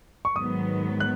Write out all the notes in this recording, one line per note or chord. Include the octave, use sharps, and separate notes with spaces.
C#6
G#2 D#3 F#3 B3 D#6
F#6